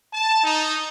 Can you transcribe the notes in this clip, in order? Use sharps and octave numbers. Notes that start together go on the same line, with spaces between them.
A5
D#4